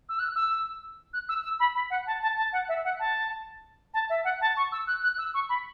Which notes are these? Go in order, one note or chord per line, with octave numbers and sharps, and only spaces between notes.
E6
F#6
E6
F#6
E6
E6
B5
B5
F#5
A5
A5
A5
F#5
E5
F#5
A5
A5
E5
F#5
A5
C#6
E6
F#6
F#6
E6
C#6
B5